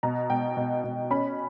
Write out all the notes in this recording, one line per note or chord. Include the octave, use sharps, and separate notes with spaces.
B2 A#5
B2 G5
B2
B2
C#4 B5